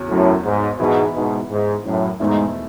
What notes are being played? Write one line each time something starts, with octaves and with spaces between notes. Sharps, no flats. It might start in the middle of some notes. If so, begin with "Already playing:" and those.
Already playing: E2 C#3 F#3 C#4
F#2 A2
G#2
G#2 B2 E3 B3 E4
G#2 B2
G#2
F#2 A2
E2 G#2 B2 A3 E4